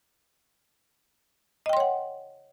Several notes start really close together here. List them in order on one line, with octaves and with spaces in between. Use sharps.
D#5 G5 C6 C#5 F#5